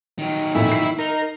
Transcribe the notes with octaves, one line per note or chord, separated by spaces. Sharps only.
D#3 F#3
F2 A#2 E4
C7
D#4 A#4